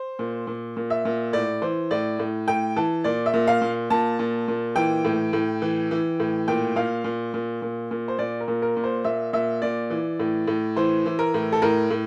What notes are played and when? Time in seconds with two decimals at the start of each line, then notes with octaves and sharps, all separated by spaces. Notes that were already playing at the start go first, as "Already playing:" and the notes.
Already playing: C5
0.19 A#2
0.47 A#2
0.77 A#2
0.90 E5
1.05 A#2
1.33 A2 D5
1.62 E3 C5
1.91 A2 D5
2.19 A2
2.48 A2 G5
2.76 E3 A5
3.04 A#2 D5
3.26 E5
3.34 A#2
3.47 F5
3.62 A#2
3.90 A#2 A5
4.19 A#2
4.48 A#2
4.76 E3 G5
5.05 A2
5.33 A2
5.62 E3
5.91 E3
6.20 A2
6.48 A#2 G5
6.76 A#2 F5
7.04 A#2
7.34 A#2
7.62 A#2
7.91 A#2
8.08 C5
8.19 A#2 D5
8.40 A#4
8.48 A#2
8.62 A#4
8.77 A#2
8.84 C5
9.05 A#2 E5
9.33 A#2 E5
9.62 A#2 D5
9.90 E3
10.20 A2
10.47 A2
10.76 E3 C5
11.06 E3
11.19 A#4
11.34 A2
11.53 A4
11.62 A2 A#4
11.90 A2